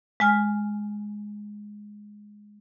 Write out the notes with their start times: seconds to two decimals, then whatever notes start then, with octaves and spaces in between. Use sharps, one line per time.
0.20 G#3 G#5 F6